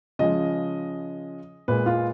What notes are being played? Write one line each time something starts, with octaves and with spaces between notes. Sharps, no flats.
C#3 F3 G#3 D#5
A#2 G#3 B4
F4